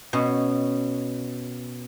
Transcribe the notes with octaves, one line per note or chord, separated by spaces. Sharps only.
B2 C#4